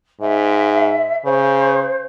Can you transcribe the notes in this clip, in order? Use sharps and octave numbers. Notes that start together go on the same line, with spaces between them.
G#2 E5
C#3 C5